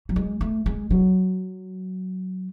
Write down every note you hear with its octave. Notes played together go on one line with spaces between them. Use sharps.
F#3
G#3
A3
G#3
F#3